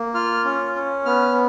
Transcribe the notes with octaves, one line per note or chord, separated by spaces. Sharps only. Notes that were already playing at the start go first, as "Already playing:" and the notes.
Already playing: A#3
F4 F6
C#4
C#4
B3 F6